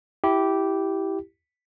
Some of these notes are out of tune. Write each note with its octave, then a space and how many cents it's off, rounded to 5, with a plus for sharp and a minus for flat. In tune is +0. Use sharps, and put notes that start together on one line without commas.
E4 +0 G4 -10